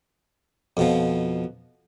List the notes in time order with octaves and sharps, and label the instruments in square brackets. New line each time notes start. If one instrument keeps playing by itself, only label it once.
[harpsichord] F2 B2 F3